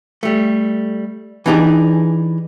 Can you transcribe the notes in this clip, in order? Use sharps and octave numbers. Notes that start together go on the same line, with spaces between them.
G3 A3
E3 D4 D#4 G4 G#4